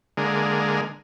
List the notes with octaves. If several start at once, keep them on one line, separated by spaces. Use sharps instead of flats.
D3 G#3 A#3